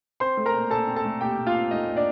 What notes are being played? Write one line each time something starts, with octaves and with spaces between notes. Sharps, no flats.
C4 C5 C6
A3
A#4 A#5
A#2
A#2 A4 A5
C4
A4 A5
A3
A#2 G4 G5
A#2
F4 F5
C4
A3 D#4 D#5
A#2
D4 D5